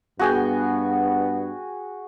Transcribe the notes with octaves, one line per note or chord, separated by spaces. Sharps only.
G2 B3 F#4 G#4 G5